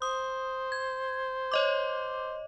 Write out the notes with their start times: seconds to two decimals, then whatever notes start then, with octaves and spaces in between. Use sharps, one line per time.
0.02 C5 D#6
0.72 G#6
1.52 C#5 D#5 D6